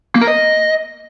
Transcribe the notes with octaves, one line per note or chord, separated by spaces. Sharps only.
A#3
A#4
D#5